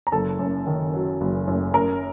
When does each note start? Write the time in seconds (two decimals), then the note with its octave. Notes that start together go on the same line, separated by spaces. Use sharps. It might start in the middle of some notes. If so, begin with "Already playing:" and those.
0.07 A#5
0.12 F#1 A4 A5
0.39 F#2
0.67 D#3
0.94 F#3
1.21 F#1
1.48 F#2
1.74 F#2 A#4 A#5